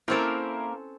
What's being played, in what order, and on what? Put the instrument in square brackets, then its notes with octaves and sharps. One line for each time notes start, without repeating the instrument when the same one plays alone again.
[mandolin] A#3 A#4 [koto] C4 C#4 A4 [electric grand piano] E4 C5